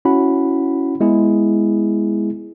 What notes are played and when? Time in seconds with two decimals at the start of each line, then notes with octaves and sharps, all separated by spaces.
0.05 C#4 E4 F#4 F#5 B5
1.01 G#3 B3 E4 G#4